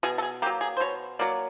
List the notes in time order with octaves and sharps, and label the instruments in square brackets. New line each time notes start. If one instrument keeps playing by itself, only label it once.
[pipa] B2 G#4
A4
G#4
A#3 G4
F#3
G#4
C5
B2 C#5
F#3 A#3 D5